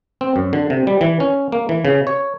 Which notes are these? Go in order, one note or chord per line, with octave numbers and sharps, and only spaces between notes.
C4
F#2
D3
C3
G3
E3
C#4
A#3
E3
C#3
C#5